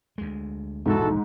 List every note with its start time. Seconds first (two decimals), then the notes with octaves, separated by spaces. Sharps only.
0.18 D2 G#3
0.86 E1 A#1 D#2 G#2 E4 F#4 A4